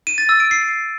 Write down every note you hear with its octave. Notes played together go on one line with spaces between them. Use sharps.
D#7
A6
E6
D7
C7